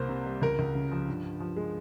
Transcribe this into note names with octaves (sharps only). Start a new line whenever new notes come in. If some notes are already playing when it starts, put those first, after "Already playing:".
Already playing: C2 A#3 C5
C3
G3
C#2 A#4
C#2
C#3
F3
G2
G2
F3
G#3